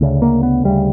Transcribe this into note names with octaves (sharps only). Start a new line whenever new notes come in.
D2 C#3
A#3
B3
D2 C#3 G3